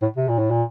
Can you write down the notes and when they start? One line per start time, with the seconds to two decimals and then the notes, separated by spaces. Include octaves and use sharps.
0.02 A2
0.16 C3
0.28 A#2
0.39 A2
0.51 A#2